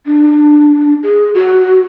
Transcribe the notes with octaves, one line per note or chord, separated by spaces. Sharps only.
D4
G#4
F#4